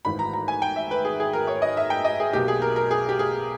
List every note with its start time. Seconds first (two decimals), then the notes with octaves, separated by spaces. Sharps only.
0.05 G#1 G#2 E3 B5
0.19 A#5
0.33 A#5
0.48 G#5
0.62 G5
0.76 E5
0.91 B4
1.05 G#4
1.20 G#4
1.33 A#4
1.47 C#5
1.62 D#5
1.77 E5
1.90 G5
2.04 D#5
2.20 G#4
2.33 B1 B2 A#3 G4
2.48 G#4
2.62 A#4
2.76 A#4
2.91 G#4
3.09 G4
3.19 G#4